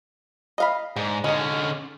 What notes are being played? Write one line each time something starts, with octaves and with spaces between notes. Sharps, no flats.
D#5 F5 B5
G#2 D4
D3 G#3 C#4 D#4